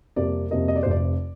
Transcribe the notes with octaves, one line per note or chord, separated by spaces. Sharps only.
F2 C3 G3 A#3 D5
F2 C3 G3 A#3 D#5
D#5
D5
F1 F2 C3 C5
D5